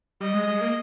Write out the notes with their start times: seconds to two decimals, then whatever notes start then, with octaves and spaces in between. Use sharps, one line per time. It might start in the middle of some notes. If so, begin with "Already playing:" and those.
0.21 G3 D#5
0.34 G#3
0.48 G#3
0.61 A#3